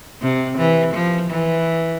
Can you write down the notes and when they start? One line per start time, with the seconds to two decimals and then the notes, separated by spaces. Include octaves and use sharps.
0.22 C3
0.58 E3
0.94 F3
1.30 E3